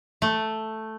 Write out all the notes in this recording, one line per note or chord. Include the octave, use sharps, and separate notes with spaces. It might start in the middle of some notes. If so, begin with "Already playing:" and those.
A3